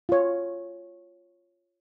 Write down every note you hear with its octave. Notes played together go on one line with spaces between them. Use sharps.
F4 C#5